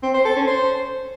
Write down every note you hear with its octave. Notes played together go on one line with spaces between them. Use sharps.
C4
C5
A4
C#4
C5